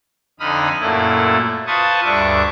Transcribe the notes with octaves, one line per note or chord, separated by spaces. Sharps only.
F2 D3 D#4 B5 D#6 F6
F#2 A#2 A3 E4 A4
F4 B4 C5 A5 C#6 D#6
D2 G2 D4 E5 C#6 D6